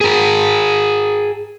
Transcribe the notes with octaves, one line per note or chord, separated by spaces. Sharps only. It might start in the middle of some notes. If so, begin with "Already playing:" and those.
G#4 A#4